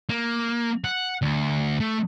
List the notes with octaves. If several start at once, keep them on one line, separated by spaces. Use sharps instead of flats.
A#3
F#5
D2
A3